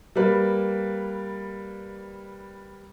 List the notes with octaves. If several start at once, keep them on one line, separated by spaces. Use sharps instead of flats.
G3 A#3 B4